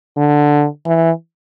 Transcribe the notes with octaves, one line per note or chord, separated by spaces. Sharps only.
D3
E3